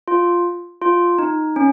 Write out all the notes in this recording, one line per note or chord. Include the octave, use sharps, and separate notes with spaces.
F4
F4
D#4
C#4